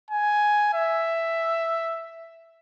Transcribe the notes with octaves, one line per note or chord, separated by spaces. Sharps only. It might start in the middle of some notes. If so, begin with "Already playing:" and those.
G#5
E5